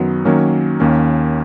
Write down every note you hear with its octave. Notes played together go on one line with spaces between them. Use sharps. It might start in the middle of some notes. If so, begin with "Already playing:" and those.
Already playing: F#2 D#3 F#3 B3
D#3 F#3 A#3 C#4
D#2 D#3 A#3 C#4